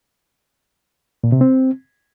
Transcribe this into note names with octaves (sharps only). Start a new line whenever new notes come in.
A#2
C3
C4